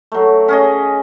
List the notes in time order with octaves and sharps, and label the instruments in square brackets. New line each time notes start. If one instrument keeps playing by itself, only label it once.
[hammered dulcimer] F#3 A3
C#4 G#4 D#5